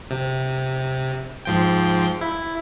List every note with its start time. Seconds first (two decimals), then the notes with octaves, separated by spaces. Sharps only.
0.10 C3
1.45 G#2 F3 G5
2.21 E4